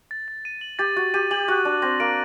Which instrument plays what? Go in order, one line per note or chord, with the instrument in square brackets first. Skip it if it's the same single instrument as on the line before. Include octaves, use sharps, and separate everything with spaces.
[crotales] A6
A6
D#7
F#7
[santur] G4 [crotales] A6
[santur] F#4 [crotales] A6
[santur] G4 [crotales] D#7
[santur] G4 [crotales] F#7
[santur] F#4 [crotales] F#6
[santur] D4 [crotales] F#6
[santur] C4 [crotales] A#6
[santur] A#3 [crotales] D7